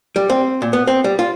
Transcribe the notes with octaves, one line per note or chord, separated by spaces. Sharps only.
G3
C4
A#2
B3
C4
G3
F4